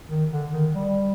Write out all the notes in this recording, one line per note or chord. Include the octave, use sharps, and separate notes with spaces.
D#3
D3
D#3
G3